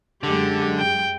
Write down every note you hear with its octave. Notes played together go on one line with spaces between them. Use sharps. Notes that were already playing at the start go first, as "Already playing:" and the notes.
F#2 D3 G#3 G4
G5